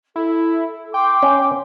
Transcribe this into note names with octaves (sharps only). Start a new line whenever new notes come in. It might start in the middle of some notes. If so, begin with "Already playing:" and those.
E4 A4
F5 G5 C6 D6
C#4